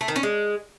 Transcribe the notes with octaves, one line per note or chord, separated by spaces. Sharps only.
A3
D#3
C#4
G#3